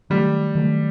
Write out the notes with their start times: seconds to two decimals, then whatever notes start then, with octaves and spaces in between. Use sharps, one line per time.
0.10 D#3 F#3 G3 A3
0.55 D#3 F#3 A3